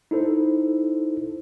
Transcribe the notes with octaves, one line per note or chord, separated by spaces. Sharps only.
D#4 E4 A4 C5